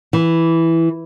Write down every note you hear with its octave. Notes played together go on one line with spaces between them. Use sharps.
E3